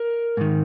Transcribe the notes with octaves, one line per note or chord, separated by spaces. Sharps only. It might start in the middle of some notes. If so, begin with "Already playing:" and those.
Already playing: A#4
G#2 D#3